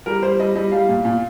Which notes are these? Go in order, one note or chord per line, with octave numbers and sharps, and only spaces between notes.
G3 A#4
G3 C5
G3 D#5
G3 D#5
G3 F5
A#2
A#2